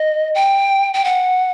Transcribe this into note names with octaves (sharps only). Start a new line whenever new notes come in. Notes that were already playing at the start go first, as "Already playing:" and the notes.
Already playing: D#5
G5
G5
F#5